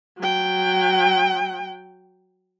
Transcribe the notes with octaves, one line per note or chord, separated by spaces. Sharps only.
F#3 G5